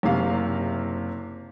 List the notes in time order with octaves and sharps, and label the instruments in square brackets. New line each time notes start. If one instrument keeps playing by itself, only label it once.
[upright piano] F#1 C3 F5